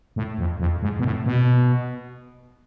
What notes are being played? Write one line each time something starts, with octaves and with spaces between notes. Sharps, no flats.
A2
F2
F2
G#2
B2
A2
B2